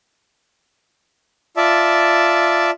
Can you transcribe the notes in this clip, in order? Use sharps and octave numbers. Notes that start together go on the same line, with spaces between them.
F4 D5 E5 A5